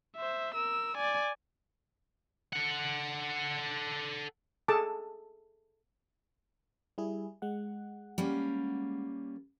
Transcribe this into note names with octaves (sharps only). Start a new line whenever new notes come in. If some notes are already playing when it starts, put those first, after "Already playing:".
C5 E5
A#4 E6
D5 G#5
A4 F#5
G#4 A4 A5 D6
G3 E4 G#4
G#3 F#5
G3 A#3 C#4